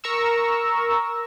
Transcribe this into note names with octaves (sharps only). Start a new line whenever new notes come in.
A#4 A#5 C#6 E6